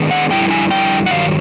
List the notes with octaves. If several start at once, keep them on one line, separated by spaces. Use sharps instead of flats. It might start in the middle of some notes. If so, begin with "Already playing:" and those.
Already playing: D#3 G#3 B3 D4
F#5
F2 D3 G3 E4 G5
G#5
G5
F#5
G2 D#3 F#3 F5